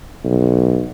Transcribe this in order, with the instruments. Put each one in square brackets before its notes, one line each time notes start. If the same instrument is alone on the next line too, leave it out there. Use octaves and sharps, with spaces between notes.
[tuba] B1